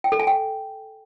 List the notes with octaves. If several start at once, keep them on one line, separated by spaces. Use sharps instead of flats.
G5
A4
G#5
G5